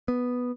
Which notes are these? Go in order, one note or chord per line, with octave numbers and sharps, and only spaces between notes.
B3